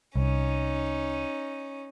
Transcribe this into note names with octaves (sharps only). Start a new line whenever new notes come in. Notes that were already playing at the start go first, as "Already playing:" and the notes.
C2 C#4 D#4